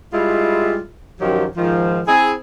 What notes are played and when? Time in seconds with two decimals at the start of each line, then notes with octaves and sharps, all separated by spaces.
0.13 G3 G#3 E4 F4
1.21 F#2 D#3 F3 F#3 G4
1.57 G#2 D#3 F3
2.07 C4 E4 G#4